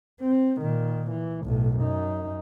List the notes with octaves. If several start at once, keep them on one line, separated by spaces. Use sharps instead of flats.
C4
A#2 D#3
E3
B1 A2
F#2 D#4